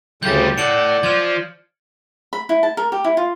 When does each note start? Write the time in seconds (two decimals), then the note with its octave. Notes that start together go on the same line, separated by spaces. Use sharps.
0.23 D2 C#3 G3 A3 F4 G4 G6 A6
0.58 A2 A4 D5 F#5 C#7 D7 F#7
1.03 F3 F4 F6 G#6
2.33 B5
2.49 E4
2.63 A5
2.77 A#4
2.92 G4
3.04 E4
3.17 F4